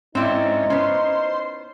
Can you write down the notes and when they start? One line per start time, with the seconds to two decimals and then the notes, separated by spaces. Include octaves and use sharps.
0.15 G#2 C4 C#4 D#4 E4 D5
0.70 B3 C#4 C5 C6